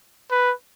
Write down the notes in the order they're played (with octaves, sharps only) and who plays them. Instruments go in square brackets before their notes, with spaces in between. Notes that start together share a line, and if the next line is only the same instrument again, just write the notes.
[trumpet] B4